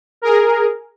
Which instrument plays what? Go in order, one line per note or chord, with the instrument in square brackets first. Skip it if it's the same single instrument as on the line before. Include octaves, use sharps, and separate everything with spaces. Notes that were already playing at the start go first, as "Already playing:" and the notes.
[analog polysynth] G#4 A#4